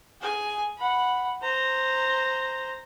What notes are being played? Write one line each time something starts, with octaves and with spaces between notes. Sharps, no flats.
G#4 G#5
F#5 B5
C5 A#5